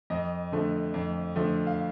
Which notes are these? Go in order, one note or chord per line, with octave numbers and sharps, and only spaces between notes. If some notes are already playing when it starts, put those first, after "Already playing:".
F2 D#5
D3 F3 A3
F2
D3 F3 A3
F5